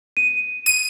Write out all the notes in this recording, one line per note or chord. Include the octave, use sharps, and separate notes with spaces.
D#7
D#7